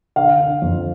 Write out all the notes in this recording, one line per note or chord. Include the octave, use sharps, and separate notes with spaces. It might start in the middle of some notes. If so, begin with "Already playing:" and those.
D3 F5
D3
F2